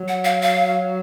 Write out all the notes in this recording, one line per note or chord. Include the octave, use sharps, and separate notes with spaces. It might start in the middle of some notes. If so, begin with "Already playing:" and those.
Already playing: F#3
F#5
F5
F5